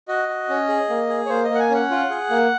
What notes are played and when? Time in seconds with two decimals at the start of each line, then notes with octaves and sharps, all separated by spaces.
0.08 F#4 D#5
0.28 F#4
0.49 C#4
0.69 G#4
0.90 A#3
1.09 G#4
1.26 C#5
1.29 A#3 C5
1.44 D#5
1.50 A#3
1.55 F#5
1.59 G#5
1.70 C#4 F#5
1.91 F4
2.10 G#4
2.30 A#3